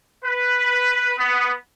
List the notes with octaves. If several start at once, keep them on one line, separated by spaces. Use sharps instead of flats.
B4
B3